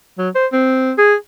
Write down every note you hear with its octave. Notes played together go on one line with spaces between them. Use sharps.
F#3
C5
C4
G#4